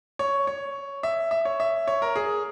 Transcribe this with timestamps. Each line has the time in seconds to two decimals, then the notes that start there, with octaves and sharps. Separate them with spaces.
0.19 C#5
0.47 C#5
1.03 E5
1.31 E5
1.45 C#5
1.60 E5
1.87 C#5
2.02 A#4
2.16 G#4